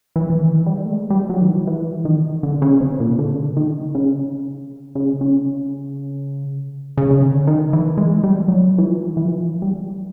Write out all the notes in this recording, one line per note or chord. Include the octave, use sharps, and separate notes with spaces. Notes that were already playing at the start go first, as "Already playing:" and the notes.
E3
E3
D#3
G3
A3
G#3
G3
F#3
D#3
E3
E3
D#3
D3
C#3
C3
A#2
D3
C#3
D3
D#3
C#3
C#3
C#3
C#3
C#3
D3
D#3
E3
G#3
G3
F#3
E3
F3
D#3
E3
F3
G3